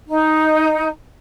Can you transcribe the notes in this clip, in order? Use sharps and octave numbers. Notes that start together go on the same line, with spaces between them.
D#4